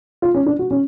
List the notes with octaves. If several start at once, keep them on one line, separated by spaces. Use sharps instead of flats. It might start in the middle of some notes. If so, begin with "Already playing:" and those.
F4
C#4
D4
F#4
C#4